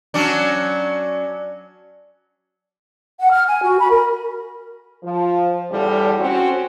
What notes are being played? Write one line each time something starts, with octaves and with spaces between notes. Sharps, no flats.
F#3 C#4 D4
F#5
F6
G#5
F#4
B5
A#4
F3
E2 A2 D3 G3
C4 C#4 F#4